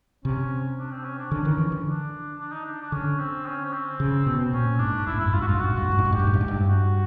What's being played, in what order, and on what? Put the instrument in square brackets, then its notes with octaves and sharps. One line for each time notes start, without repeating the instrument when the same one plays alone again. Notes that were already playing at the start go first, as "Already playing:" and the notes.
[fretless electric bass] C3 [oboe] C#4
[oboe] D4
C4
C#4
D4
[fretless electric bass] D3 [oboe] C#4
[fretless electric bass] D#3
E3
D3
[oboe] D4
D4
D#4
D4
D4
[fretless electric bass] D3 [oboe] C#4
[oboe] C4
C#4
C#4
C4
[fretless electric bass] C#3
B2
[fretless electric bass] A#2 [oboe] C#4
[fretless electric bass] G#2 [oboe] D4
[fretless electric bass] G2 [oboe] E4
[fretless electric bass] G#2
[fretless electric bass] G2 [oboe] E4
[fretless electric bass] G#2
[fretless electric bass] G2 [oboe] F4
[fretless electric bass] G#2 [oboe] F#4
[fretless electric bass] G2 [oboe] F4
[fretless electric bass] G#2
[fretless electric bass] G2 [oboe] F#4
[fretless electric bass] G#2
G2
G#2
G2
G#2
G2
[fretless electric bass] G#2 [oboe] G4
[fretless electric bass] G2
G#2
G2
G#2
G2
[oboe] F#4